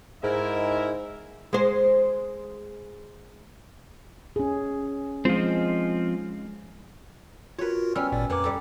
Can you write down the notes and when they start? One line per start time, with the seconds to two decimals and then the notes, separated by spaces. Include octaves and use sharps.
0.23 G#2 E4 A#4 E5
1.53 G#3 C5
4.36 C#4 G#4
5.25 F3 G#3 C4 F4
7.59 F4 F#4 A#4 B4 C#5
7.95 G3 B3 C#4 E6 F6
8.12 G#1 A#2 D5
8.30 F2 A#3 B4 F#5 G#5 D6
8.44 G3 A4